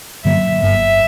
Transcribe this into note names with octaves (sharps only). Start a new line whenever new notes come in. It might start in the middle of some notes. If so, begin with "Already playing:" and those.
G2 D3 F#3 A#3 E5
G1 G2 F#3 A#3 E5